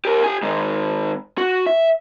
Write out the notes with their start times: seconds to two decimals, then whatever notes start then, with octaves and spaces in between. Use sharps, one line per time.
0.05 G4 A#4
0.24 G4 G#5
0.43 D#3 G#3
1.38 F#4
1.66 E5